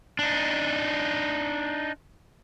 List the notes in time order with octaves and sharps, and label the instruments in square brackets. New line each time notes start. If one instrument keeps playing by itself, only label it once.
[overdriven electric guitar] D4 D#4